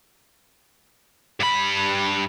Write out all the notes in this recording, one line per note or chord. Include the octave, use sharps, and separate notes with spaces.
G2 B5